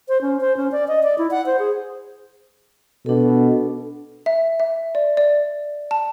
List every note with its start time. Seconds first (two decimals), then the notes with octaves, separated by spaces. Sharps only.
0.09 C5
0.21 C#4
0.40 C5
0.57 C#4
0.72 D5
0.88 D#5
1.03 D5
1.18 E4
1.31 F#5
1.46 C5
1.59 G#4
3.06 B2 D4 A4
4.26 E5
4.60 E5
4.95 D5
5.17 D5
5.91 A5